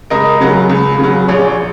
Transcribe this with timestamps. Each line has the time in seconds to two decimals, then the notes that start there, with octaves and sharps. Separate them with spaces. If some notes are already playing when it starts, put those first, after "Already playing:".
0.10 C#2 A#4 D#5
0.41 C#3 F#3
0.70 C#2
0.99 C#3 F#3
1.28 A#1 G#4 C#5